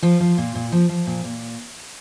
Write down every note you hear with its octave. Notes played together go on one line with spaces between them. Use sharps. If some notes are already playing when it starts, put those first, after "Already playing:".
F3 F4
F3
A#2
A#2
F3
F3
A#2
A#2